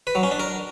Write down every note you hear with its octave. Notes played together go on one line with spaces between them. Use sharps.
B4
F#3
C#4
D4
A#4